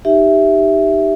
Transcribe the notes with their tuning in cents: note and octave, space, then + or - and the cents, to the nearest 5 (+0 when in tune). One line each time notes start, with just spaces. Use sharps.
D#4 -10 G4 +0 E5 +0